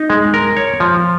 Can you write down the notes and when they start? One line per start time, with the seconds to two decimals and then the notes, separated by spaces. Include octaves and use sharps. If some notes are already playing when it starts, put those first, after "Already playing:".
Already playing: D#4
0.10 G#3
0.34 A#4
0.57 C#5
0.80 F3